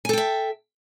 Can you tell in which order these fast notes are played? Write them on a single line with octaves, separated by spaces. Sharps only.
G#5 A4 G5 E5